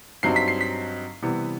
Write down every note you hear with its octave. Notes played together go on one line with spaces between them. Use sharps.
G2 F#3 C4 D#4 C7
B6
C7
B6
C3 E3 G3 B3